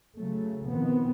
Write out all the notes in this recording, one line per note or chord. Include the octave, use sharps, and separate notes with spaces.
C#3 F#3 A3
B2 D#3 F3 B3 C4